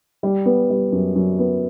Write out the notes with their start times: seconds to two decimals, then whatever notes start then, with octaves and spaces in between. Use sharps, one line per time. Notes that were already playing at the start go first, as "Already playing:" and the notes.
0.23 G3
0.46 B3
0.70 G3
0.92 F#2
1.15 F#2
1.39 B3